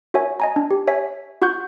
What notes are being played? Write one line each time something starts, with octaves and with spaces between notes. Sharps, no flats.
F#4 A#4 C#5 E5 G#5
D#5 G#5 A#5
D4
G4
C#5 E5 G#5 B6
F4 F#4 F#5 C#6 F#6 G6